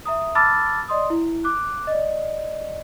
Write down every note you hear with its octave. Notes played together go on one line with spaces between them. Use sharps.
E5 A#5 D#6
A5 B5 D6 E6 F6 A6
D5 D#5 C6 D#6
E4
D6 F#6
D5 D#5